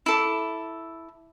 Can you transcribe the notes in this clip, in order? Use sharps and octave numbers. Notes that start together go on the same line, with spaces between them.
E4 A4 D6